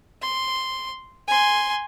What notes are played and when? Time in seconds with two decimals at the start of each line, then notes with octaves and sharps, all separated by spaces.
0.22 C6
1.28 G#5 C6